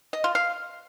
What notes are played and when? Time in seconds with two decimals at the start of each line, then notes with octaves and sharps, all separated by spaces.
0.13 D#5
0.24 F4
0.35 F5